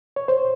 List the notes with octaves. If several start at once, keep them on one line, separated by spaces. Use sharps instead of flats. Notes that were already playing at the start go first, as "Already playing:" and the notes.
C#5
C5